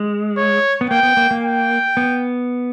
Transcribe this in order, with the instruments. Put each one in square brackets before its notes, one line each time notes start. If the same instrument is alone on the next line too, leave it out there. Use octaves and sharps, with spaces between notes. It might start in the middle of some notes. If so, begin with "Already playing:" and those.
Already playing: [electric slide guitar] G#3
[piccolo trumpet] C#5
[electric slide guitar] B3
[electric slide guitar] A#3 [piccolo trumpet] G5
[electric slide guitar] B3
A#3
A#3
[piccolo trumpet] G5
[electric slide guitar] B3